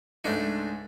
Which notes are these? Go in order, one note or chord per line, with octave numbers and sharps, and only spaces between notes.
C#2 G#2 A3 D4 D#4 G#5